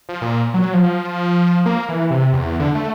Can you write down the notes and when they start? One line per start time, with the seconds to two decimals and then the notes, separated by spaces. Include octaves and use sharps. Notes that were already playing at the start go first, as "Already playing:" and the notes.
0.09 F3
0.22 A#2
0.54 F#3
0.74 F3
1.66 A#3
1.89 E3
2.10 C3
2.33 E2
2.60 D3
2.75 A3